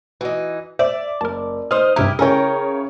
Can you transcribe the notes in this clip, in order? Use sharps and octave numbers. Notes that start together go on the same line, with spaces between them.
E3 D#4 F#4
C5 D5 E5
F#1 A#4 A5
D#4 C5 D#6 F6
G2 C3 D#4 E4 G4
C#3 C#4 E4 A4 A#4 C#5 G5